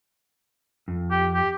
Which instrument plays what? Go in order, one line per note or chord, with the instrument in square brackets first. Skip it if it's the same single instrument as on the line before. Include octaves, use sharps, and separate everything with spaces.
[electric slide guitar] F2
[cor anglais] G4
G4